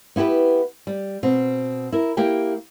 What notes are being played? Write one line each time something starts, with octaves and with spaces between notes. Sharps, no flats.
B3 E4 F#4 G4 B4
G3
B2 C4
E4 A#4
A#3 E4 G4 G5